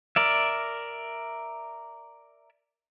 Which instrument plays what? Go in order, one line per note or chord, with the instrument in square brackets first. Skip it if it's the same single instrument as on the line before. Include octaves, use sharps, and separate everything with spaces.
[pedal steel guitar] A#4 D5 E5